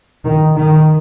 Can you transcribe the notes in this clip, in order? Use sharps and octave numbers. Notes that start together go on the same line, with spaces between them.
D#3
D#3